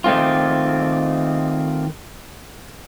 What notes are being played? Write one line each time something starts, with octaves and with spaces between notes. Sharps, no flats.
D#3 A3 C4 F4